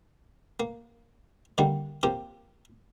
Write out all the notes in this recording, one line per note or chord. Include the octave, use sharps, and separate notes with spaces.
A#3
D3 D#3 G3 A#3
F3 A#3 C4 G4